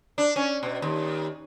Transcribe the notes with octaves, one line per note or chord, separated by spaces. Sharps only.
D4
C#4
B2
D#2